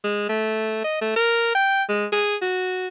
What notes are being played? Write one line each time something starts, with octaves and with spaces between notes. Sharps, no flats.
G#3
A3
D#5
A3
A#4
G5
G#3
G#4
F#4